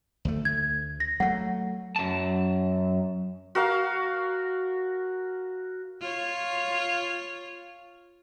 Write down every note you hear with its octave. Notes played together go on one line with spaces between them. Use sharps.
D2 A3
G#6
A#6
F#3 A3 F#5
F#2 A5
F#4 A#4 F5
F4 C#5